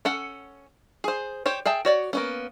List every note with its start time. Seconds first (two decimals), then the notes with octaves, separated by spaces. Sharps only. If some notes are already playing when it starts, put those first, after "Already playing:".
0.05 C#4 A4 F#5
1.04 G#4 C5
1.46 G4 C5 C#5
1.66 G#4 E5 G5 A5
1.85 F#4 C#5 D5
2.13 A#3 B3 C#4